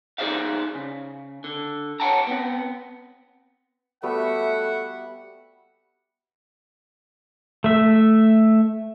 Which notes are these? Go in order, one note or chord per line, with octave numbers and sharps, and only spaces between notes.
D#4 G#4 C5 D5 E5 F5
C#3
D3
C#5 D#5 F#5 G5 A5 A#5
B3 C4
G3 A3 B3 F#4 E5 F#5
A3 E5